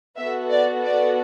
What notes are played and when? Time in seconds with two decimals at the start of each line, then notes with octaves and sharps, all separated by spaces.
0.18 B3 F#4 A4 E5
0.51 D5
0.84 D5